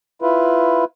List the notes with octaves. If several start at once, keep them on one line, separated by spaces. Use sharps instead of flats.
E4 F4 B4